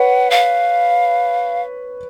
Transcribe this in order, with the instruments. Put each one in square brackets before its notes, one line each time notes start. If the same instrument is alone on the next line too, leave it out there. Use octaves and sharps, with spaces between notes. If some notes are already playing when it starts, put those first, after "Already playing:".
Already playing: [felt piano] B4 C#5 [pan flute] F#5
[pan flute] F5